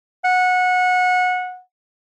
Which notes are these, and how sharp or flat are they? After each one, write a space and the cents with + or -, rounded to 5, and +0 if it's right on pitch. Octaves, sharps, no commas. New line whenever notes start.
F#5 -20